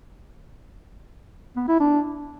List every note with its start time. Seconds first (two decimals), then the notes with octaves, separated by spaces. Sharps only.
1.56 B3
1.68 E4
1.80 D4